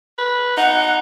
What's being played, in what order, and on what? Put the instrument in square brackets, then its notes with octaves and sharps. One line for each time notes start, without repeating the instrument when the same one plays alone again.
[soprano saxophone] B4
[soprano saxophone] D#4 [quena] F#5